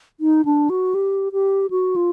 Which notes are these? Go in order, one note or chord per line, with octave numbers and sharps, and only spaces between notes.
D#4
D4
F#4
G4
G4
F#4
F4